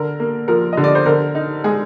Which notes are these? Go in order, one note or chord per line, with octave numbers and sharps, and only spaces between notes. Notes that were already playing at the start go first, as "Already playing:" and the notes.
Already playing: D3 A#4
A#3
F3 A#4
D3 D#5
D5
C5
D3 A#4
D#4
G#3 G#4